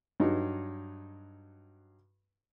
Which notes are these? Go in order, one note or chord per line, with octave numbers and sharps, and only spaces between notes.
G2 F#3 D#4